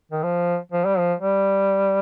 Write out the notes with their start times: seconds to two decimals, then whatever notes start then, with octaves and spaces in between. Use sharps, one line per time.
0.12 D#3
0.23 F3
0.72 F3
0.85 G3
0.99 F3
1.20 G3